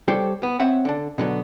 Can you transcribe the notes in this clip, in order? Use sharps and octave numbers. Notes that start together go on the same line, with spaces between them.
G3 G4 A4 C5 C#5
B3
C4 C#5 E5 F#5
D3 D4
B2 D3 F#3 B3